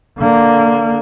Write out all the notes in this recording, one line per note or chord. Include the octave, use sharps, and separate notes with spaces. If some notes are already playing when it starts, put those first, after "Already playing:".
D3 A#3